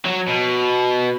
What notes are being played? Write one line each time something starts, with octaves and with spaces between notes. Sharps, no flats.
F#3
B2